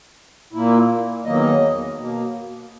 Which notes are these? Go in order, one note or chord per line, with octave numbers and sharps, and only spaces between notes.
A#2 A#3 E4
E2 D#3 F#3 A#3 D#5
B2 A#3